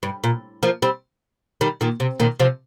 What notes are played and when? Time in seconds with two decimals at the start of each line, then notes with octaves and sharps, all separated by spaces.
0.03 G2
0.24 A#2
0.63 F3 A#3
0.82 G3 C4
1.61 D#3 G3
1.81 A#2 D#3
2.00 C3
2.20 A#2 D#3
2.40 C3 F3